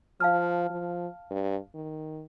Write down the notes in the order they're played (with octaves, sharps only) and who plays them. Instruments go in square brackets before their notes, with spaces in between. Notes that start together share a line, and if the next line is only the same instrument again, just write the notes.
[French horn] F3 [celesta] F5 A5 F6
[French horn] F3
G2
D#3